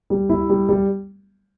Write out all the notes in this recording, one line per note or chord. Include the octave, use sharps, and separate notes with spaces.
G3
E4
G3
G3